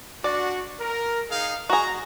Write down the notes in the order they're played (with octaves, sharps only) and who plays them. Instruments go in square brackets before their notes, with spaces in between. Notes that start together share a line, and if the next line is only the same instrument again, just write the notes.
[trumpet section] D4 F#4 [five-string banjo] D5
[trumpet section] A#4
D#4 G#4 F5
[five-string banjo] F#4 G#4 [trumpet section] A#5